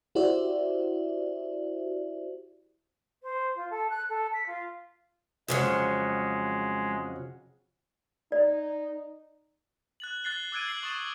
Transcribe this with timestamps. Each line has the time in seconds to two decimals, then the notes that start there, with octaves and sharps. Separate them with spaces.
0.15 E4 F#4 G4 C5 D5 E5
3.23 C5
3.55 F4
3.70 A4
3.90 F#6
4.09 A4
4.33 B6
4.46 F4
5.48 F2 C#3 F#3 G#3
8.32 D#4 D5
10.00 F#6 A6 F#7
10.24 F#6 A6 C7 G7
10.52 D6 E6 F#6 G#6 D7 D#7
10.67 E6 G#6 C7 F#7
10.83 C#6 D#6 A6 E7